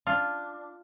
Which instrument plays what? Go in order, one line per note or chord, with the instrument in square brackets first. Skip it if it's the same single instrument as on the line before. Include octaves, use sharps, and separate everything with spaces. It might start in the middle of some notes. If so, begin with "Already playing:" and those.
[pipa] D4 [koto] F4